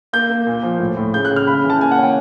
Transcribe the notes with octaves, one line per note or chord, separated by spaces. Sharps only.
A#3 G6
A#3
A#2
F3
A2
A2
C#3 G6
F#6
C#3
F6
C#3 B5
E3
A5
A#3 G#5
F#5
C#4 G5